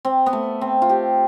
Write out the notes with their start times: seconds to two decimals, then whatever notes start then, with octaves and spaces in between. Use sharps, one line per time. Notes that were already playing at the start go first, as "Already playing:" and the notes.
0.05 C4
0.26 B3
0.33 A3
0.61 C4
0.82 F4
0.89 G4